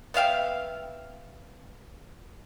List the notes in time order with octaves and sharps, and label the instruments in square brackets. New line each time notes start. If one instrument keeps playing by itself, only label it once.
[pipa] B3 E5 F5 G5